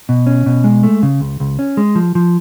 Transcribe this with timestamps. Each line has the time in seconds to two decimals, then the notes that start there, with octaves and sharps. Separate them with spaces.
0.09 B2
0.26 C#4
0.46 B2
0.64 G#3
0.83 A3
1.03 C#3
1.21 C#2
1.40 C#2
1.59 C#4
1.77 G#3
1.95 F3
2.15 F3